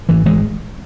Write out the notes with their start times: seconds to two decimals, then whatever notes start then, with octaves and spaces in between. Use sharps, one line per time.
0.09 G#1 E3
0.26 E3 G#3